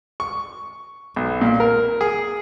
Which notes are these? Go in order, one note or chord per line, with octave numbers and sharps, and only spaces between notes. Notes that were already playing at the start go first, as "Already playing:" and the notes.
C#6
B1
A#2
A#4
G#4